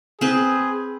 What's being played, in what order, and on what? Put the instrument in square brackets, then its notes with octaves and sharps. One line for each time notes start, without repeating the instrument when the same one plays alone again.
[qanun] C4 B4 [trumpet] G#4